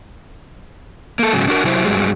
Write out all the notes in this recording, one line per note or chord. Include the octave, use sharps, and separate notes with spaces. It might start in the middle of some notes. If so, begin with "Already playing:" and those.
A#3 A4
G#2 C#3 F#3
D4 F#4 A#4
C3 F#3 E4 C5
G2 F#3 G#3